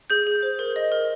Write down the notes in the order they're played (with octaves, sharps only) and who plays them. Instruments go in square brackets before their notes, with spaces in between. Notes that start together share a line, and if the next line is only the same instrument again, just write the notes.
[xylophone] G#4 G6
G#4
C5
A#4
D#5
A#4